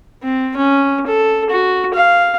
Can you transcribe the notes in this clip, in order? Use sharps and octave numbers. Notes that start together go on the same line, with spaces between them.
C4
C#4
A4
F#4
F5